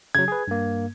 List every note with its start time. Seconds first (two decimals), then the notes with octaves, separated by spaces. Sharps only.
0.15 C#3 F#3 G#6
0.28 G#4 B4
0.48 G2 A#3